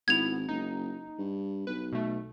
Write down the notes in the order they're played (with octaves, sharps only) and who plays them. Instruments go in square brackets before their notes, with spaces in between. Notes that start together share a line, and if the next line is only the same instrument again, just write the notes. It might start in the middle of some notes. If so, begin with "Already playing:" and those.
[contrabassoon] G#1 [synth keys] B3 E4 [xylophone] G#6 F7
[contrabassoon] F#1 [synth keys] D#4
[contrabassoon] G2
[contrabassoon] B1 [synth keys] B4
[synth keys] B2 A3